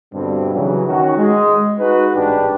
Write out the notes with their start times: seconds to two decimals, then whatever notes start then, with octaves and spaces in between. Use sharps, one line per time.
0.13 G2 B2 D3 G3 C4
0.54 C#3 E3 F#3
0.87 D#3 C#4 F#4
1.18 G#3
1.79 G#3 D#4 F#4 B4
2.15 A1 G#2 D4 G4 B4